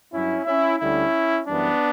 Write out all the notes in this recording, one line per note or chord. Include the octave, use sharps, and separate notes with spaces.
G2 F#3 C#4 E4
C#4 E4
D2 D3 G3 C#4 E4
F#2 E3 G3 B3 D4